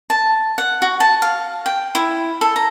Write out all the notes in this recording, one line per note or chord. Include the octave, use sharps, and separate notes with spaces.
A5
F#5
F#4
A5
F5
G5
E4
A4
A#5